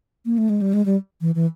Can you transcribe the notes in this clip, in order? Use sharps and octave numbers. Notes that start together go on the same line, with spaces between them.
A#3
A3
G#3
G3
G#3
G3
E3
E3